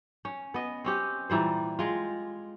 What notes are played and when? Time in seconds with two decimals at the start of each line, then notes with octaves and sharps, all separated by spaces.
0.25 C#4
0.54 B3 D#5
0.84 C4 C#4 G4
1.30 A#2 E3 G3 C5
1.79 G#3 F4